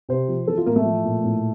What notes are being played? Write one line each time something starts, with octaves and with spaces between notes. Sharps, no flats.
C3 C5
F3
E3 A4
F4
A2 A#3
A3
F3
A#2
A2